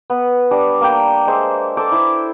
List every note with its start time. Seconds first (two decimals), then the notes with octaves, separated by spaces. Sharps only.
0.10 B3
0.51 G3 D4
0.81 A#3 G5
1.27 G#3 C5 E5
1.77 A4 C5 D6
1.92 E4 E5 E6